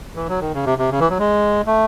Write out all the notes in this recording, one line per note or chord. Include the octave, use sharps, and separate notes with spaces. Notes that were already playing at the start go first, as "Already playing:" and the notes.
E3
F#3
D#3
C#3
C3
C3
C#3
E3
F#3
G#3
A3